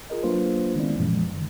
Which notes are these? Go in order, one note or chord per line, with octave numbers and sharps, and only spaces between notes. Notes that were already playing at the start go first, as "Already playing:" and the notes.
F4 G#4 A#4 D#5
F#3 A#3 D4 F4 B4 C5
D#3 G#3 B3 C#4 E4 D5
F#2 A#2 E3 F3 G#3
D3 D#3